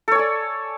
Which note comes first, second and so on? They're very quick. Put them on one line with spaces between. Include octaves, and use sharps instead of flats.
A4 C#5 G#5 D5